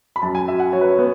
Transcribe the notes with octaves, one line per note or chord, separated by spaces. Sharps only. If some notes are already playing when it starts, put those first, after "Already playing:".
B5
F#2 A5
G#5
F#3 E5
F#5
F#3 C#5
B4
C#5
B3